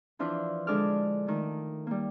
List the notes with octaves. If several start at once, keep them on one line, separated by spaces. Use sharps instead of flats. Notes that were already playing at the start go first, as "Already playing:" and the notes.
E3 F3 D4 E4 F4
D3 G#3 D4 A4 D6 F6
D#3 A3
G3 A#3